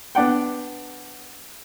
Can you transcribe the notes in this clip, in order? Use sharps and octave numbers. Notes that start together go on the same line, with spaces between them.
B3 D4 D5 F#5 G5